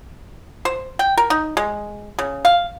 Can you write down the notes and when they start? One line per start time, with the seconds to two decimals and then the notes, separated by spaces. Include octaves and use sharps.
0.65 C5
0.99 G5
1.18 A#4
1.30 D#4
1.57 G#3
2.19 C#3
2.45 F5